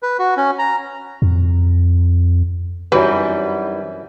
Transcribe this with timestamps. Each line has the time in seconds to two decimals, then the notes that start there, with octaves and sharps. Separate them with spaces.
0.03 B4
0.19 F#4
0.37 C#4
0.59 A#5
1.22 F2
2.92 F#2 E3 G3 C4 D#4 F#4 B4 C#5